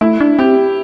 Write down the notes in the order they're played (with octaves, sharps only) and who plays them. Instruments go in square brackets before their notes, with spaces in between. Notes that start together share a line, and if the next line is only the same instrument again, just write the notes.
[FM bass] A3 [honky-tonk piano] E4
[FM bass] D4
[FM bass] C4 [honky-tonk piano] G4